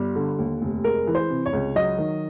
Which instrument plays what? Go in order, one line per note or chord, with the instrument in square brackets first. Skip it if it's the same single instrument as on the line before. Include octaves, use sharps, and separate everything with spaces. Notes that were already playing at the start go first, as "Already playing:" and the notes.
Already playing: [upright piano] G1 G3
D3
D#2
F1
G#3 A#4
E3
C5
C3
C#5
C#2
F#3 D#5
D#3